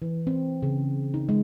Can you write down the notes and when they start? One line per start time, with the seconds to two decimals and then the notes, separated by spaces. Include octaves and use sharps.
0.02 E3
0.27 C4
0.63 C#3
1.14 D#4
1.29 G#3